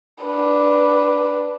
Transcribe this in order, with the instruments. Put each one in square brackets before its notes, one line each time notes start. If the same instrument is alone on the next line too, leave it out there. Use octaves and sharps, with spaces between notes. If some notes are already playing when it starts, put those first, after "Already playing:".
[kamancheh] D4 B4